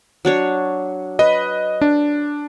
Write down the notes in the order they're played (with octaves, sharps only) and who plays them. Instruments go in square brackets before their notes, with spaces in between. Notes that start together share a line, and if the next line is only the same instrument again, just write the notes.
[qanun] F#3 D4 C#5
[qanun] B4 [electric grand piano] D#5
[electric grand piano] D4